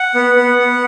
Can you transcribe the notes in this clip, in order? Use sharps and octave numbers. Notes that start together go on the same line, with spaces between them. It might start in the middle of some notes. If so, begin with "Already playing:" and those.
Already playing: F#5
B3
B3
B3